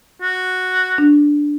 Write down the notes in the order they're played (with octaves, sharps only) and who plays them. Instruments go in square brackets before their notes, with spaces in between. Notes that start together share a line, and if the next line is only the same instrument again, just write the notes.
[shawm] F#4
[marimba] D4